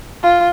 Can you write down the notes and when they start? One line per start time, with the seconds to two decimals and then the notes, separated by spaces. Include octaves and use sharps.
0.23 F4